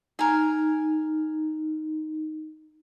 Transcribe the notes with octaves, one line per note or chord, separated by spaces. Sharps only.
D#4 A#4 G#5